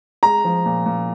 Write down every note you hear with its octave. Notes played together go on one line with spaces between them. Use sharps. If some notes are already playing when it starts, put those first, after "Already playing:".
G#3 A#5
F3
A#2
A#2